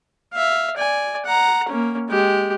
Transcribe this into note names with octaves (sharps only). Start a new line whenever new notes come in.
E5 F5
D5 G#5
F#5 A#5
A#3 C#4
G#3 G4